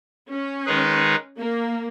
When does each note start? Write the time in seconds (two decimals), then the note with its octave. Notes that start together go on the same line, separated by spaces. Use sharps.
0.30 C#4
0.66 D#3 G#3 D#4 G#4 B4
1.37 A#3